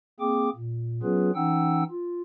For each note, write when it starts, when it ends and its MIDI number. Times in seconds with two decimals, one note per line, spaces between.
0.20 0.50 58
0.20 0.50 60
0.20 0.50 68
0.20 0.50 79
0.20 0.50 86
0.55 1.01 46
1.03 1.31 54
1.03 1.31 59
1.03 1.31 61
1.03 1.31 65
1.03 1.31 68
1.03 1.31 71
1.35 1.83 52
1.35 1.83 61
1.35 1.83 63
1.35 1.83 78
1.35 1.83 79
1.35 1.83 88
1.90 2.22 65